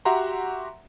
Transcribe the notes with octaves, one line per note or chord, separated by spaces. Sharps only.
F#4 G4 E5 F#5 A#5 C6